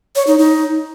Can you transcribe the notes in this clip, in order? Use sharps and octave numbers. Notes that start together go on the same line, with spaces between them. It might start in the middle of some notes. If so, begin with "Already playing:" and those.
C#5
D#4
D#4